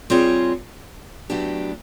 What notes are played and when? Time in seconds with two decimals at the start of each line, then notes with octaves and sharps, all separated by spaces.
0.10 G3 C4 F4 G#4 C#5
1.30 A2 F#3 B3 D4 G4